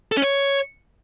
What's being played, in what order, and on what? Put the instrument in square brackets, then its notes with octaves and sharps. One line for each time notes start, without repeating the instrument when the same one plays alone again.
[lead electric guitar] A4
C#4
C#5